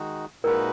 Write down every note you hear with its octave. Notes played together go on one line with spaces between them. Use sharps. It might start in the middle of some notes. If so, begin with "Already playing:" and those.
Already playing: D#3 G#3 D#4 F#4
A#2 G#3 D#4 F#4 A#4 B4